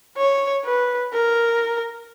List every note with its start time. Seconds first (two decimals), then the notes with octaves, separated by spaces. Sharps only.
0.17 C#5
0.64 B4
1.12 A#4